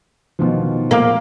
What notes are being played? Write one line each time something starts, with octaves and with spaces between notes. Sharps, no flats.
B2 D#3 F3
A#3 A#4 F5 D6